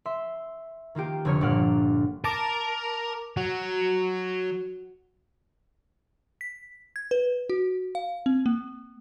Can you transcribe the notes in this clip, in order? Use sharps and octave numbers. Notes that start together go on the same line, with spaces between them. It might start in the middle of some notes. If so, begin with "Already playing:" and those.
E5 C6
D#3 A#3 F4 G4
F1 D3 C#5 F6 C#7
G1 A#2 D5 F#5 F6
A#4 A5 A#5 D6
F#3 F#4
B6
G#6
B4
F#4
F5
C4
A#3